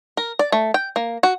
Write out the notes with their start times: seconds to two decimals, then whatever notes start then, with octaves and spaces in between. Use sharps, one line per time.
0.17 A#4
0.39 D5
0.52 A3
0.74 G5
0.96 A#3
1.23 F#4